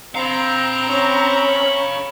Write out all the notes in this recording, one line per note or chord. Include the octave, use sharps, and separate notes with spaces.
C4 F5 A#5 B5
C#4